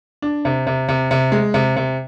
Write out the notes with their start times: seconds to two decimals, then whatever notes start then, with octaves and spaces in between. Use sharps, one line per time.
0.22 D4
0.45 C3
0.67 C3
0.89 C3
1.11 C3
1.32 G#3
1.54 C3
1.76 C3